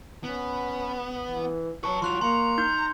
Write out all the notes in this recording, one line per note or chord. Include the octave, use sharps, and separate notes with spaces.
B3 C#4
E3
F#3 B4 A5 C#6
F3 F4 F#4 C6 F#6 F7
A#3 A#5 C6 C#7
D#4 G6